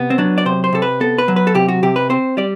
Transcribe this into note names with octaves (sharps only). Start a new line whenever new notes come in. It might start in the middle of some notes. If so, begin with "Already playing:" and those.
Already playing: C3 B3
C4
F#3 D4
D5
C3 C5
C5
C3 A4
B4
B3 A4
B4
F#3
B4
A4
C3 G4
F#4
C3 G4
B4
C4 C5
G3 D5